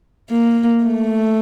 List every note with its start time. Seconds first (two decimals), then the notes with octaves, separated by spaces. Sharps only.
0.30 A#3
0.84 A3